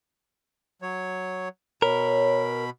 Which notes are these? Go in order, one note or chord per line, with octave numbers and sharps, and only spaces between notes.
F#3 C#5
B2 A#4 C#5 B5